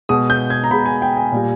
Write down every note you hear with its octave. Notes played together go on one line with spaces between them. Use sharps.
B2 G#3 D#6
G6
G#6
A#5
B2 G#3 B5
G#5
G5
G#5
A#2 G3